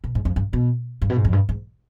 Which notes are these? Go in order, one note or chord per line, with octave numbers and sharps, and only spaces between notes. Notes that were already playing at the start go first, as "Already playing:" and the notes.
B2
G#2
F2
G2
B2
G2
B2
G#2
F2
G2
G#2